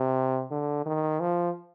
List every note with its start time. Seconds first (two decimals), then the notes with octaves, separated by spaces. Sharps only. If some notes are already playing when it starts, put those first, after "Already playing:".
Already playing: C3
0.51 D3
0.86 D#3
1.20 F3